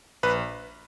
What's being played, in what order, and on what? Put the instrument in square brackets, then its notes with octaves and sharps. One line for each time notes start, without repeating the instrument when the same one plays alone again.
[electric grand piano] A#1 B4